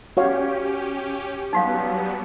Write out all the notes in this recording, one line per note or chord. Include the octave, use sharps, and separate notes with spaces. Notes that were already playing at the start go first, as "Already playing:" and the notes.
C#4 F#4 G4 C#5 F5
F#3 G3 B3 D#4 F#4 F5